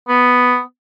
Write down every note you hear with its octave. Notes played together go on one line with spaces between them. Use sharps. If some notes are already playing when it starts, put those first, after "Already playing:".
B3